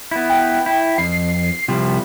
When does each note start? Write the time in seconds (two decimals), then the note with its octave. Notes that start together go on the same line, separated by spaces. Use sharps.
0.11 B3 E4
0.30 G5
0.66 E4
0.98 F2 C7
1.68 C3 F3 G3